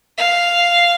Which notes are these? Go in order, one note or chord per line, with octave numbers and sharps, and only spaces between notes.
F5